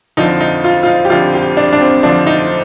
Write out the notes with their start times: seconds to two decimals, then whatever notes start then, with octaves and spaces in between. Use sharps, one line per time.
0.17 F2 D3 F3 D#4
0.41 D#4
0.64 F4
0.83 F4
0.87 D#4
1.05 G4
1.10 F2 D3 F3 F4
1.34 G4
1.57 D4
1.73 D4
1.81 C4
2.03 F2 D3 F3 D4
2.27 D#4